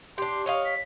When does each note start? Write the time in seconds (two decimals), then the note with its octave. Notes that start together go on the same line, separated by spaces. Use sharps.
0.18 D4 G4 C6
0.46 C#5 D#5 F5 C#6
0.65 B6